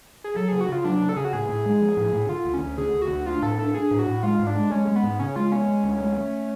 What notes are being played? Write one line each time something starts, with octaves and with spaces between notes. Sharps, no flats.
G#4
F#3 A4
C#3 G#4
F#4
C#3 F4
F#3 D4
C#3
A4
C#3 G#4
F#4
A2 G#4
A2
G#3
F3
A2
A2
D3 F4
D2
C#4
D2
D3 G#4
D2
F#4
D2
D4 F4
A2 A4
D4 A4
D4 G#4
A2
F#4
A2
G#3 F4
G#2
D4
G#3
G#3 C#4
G#3
B3
G#2
C#3 C#4
G#3 F4
B3 C#4
G#3
D2
G#3
A3